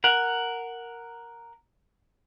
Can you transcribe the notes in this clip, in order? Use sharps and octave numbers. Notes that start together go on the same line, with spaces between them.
A#4 F#5